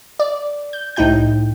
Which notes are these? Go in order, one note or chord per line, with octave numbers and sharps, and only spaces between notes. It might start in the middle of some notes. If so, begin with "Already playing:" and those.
D5
G6
C2 A2 D#4 E4 G5 G6